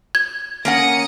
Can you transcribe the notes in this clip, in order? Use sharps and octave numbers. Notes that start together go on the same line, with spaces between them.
G#6
A#3 C#4 F#5 D#6 A#6 C#7